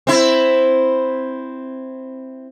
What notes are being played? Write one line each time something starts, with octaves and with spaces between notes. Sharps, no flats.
C4 E4